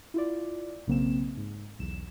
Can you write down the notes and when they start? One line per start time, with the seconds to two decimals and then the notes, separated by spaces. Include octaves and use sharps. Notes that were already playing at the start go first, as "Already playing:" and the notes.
0.14 E4 F4 D5
0.87 B1 C#3 A#3 C4 E7
1.37 G#2
1.79 B1 E2 E7